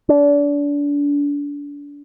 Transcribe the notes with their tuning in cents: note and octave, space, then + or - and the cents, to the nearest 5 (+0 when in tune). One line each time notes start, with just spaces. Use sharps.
D4 -30